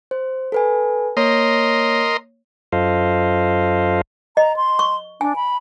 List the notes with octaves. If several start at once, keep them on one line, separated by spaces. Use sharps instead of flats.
C5
A4 B4 G#5
A#3 A#4 C#5 D#5 C6
F#2 F4 A4 C5 D#5 F5
D#5 A#5
C6
C#6
D4 G#5
B5